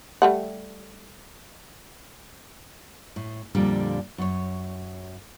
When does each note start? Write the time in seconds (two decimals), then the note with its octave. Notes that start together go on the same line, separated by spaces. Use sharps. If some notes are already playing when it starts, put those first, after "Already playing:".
0.22 G3 A3 F#5
3.16 A2
3.55 F2 A#2 D3 G3
4.18 F#2 C#5